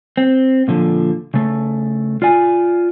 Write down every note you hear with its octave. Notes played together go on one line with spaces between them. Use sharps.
C4
A#2 D3 F3
C#3 A3
F4 D5 G#5